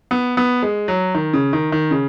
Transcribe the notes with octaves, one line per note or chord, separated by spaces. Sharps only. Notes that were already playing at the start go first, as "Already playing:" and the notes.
B3
B3
G#3
F#3
D#3
C#3
D#3
D#3
C#3